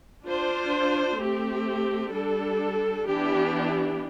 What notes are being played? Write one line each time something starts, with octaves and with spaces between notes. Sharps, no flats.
D4 F4 C5
A3 C4 G4
G3 D4 A4
E3 B3 D4 G4